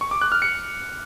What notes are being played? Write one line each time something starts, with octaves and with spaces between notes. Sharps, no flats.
C#6
D6
F#6
F6
C#7